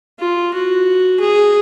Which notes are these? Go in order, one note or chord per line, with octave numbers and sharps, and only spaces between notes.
F4
F#4
G#4